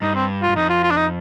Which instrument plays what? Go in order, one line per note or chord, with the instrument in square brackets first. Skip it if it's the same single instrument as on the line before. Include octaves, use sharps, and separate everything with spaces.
[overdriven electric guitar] G2 [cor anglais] D#4
[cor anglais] C4
F4
[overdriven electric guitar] G2
[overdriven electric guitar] F2 [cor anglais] D#4
[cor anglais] F4
F4
D4
D#4